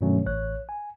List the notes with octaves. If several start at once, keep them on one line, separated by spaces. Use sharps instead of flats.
G2 B2 D#3 F#3 A3 C#4
A1 C#5 F#6
G#5